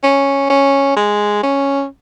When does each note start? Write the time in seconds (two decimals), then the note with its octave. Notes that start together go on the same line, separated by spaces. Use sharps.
0.03 C#4
0.50 C#4
0.96 G#3
1.43 C#4